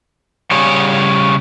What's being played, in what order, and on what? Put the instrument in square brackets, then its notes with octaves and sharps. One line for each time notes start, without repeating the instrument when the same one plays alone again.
[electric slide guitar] C#3 G3 G#4 C#5